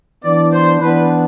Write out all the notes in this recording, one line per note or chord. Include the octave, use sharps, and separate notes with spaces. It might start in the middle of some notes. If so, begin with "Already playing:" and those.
E3 B3 D4 D5
C5
E3 B3 D4 B4